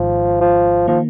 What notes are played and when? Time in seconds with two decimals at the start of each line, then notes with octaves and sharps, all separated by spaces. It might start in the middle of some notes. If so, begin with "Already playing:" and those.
Already playing: G#1 G#2 D#3 F3
0.41 F3
0.87 D#3 F3 A#3